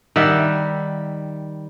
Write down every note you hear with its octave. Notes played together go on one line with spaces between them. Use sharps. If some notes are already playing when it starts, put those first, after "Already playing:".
D#3 G3 E5 F#5